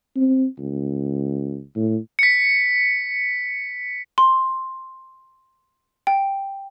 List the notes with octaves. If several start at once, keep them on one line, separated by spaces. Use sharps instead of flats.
C4
C#2
A2
B6 C#7
C6
G5